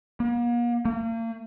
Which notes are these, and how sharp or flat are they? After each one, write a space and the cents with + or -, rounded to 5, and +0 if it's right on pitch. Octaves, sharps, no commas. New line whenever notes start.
A#3 +40
A#3 -40